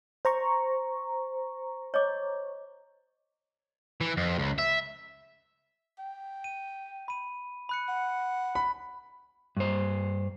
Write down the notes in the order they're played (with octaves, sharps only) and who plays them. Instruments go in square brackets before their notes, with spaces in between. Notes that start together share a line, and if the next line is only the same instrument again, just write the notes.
[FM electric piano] C5 A#5 C#6
[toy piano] C#5 D#5 D6
[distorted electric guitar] E3
F2
C#2
E5
[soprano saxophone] G5
[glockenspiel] D#7
B5 D#7
B5 F#6 C#7
[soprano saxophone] F#5
[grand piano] B5
[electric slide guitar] G2 C5